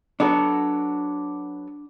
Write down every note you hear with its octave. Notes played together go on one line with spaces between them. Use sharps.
F#3 B3 D4 F#4 A4